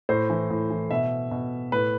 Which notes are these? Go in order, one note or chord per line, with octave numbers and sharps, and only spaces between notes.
A2 C5
E3
A2
E3
B2 E5
B2
A2 B4